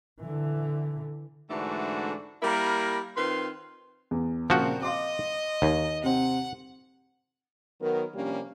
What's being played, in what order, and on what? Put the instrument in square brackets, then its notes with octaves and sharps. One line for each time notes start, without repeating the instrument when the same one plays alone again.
[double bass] D3 E3
[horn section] G#2 D3 E3 A3 D4 F#4
G3 A#3 E4 A#4
D#3 C4 F4 B4 C6
[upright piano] E2
[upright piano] A#2 C#3 [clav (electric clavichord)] F3 F#4 [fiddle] C4 A#4
[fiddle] D#5 [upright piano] F5 C6 D6
[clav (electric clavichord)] D#2
[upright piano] C3 C4 [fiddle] F#5
[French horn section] D#3 F#3 B3 A#4
C3 F3 G3 A#3 C#4 D4